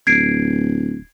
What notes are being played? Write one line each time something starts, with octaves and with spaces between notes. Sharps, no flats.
D1 G#6 C7 D7